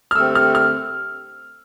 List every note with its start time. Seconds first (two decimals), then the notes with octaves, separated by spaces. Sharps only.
0.11 F6
0.15 D3 A3 C4 G4 E6
0.35 F6
0.55 F6